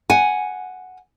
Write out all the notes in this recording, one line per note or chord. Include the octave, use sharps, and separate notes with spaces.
F#5 G#5